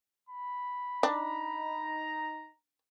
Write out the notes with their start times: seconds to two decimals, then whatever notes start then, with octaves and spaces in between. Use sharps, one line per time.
0.29 B5
1.03 D4 D#4 A#5